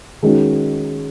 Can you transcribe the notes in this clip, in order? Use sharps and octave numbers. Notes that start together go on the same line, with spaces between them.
D#3 G#3 C#4 F#4